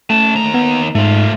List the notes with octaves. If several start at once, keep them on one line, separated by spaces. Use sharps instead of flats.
A3 C#4 A5
D#2 A#5
B3
G#2 A3 F4